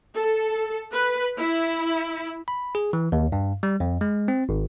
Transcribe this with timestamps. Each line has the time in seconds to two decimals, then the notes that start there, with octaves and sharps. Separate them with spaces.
0.17 A4
0.94 B4
1.38 E4
2.48 B5
2.75 G#4
2.93 E3
3.12 D#2
3.32 G2
3.63 G3
3.80 F2
4.01 G#3
4.28 C4
4.49 G#1